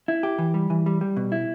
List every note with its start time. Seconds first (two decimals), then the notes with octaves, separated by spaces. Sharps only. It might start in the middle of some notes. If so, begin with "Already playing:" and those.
0.08 E4
0.23 G4
0.38 E3
0.54 G3
0.70 E3
0.86 G3
1.01 G3
1.17 B2
1.32 E4